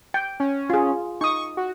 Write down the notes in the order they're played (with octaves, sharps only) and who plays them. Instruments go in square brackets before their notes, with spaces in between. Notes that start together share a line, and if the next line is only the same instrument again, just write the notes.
[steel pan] G5
[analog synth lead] C#4
[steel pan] F4 G#4
[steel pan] D#4 D#6 [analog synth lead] C#6
[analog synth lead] F#4